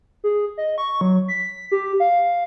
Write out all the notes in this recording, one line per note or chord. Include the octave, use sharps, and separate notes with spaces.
G#4
D#5
C#6
F#3
B6
G4
F5